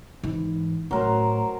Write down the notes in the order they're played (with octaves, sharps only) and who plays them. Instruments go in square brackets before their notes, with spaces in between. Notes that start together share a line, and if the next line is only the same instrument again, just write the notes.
[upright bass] G#2 E3
[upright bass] A2 [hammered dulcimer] F#3 A#4 C5